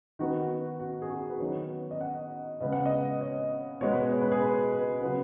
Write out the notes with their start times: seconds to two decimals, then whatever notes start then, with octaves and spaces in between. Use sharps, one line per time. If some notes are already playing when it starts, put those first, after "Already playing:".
0.19 D#3 B3 F#4
0.79 F#4
1.02 G#4
1.10 F#4
1.30 B4
1.40 D#3 F#3 B3 C#5
1.91 D#5
2.01 F#5
2.61 C#3 G#3 B3 D#5
2.72 F#5
2.85 D#5
3.21 C#5
3.81 B2 G#3 B3 C#5
3.91 B4
4.02 G#4
4.12 C#5
4.21 B4
4.32 G#4
4.41 B4
4.72 B4
5.02 C#3 F#3 B3